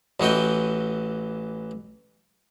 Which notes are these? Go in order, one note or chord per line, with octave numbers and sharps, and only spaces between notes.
A1 E3 F#4 D#5 G5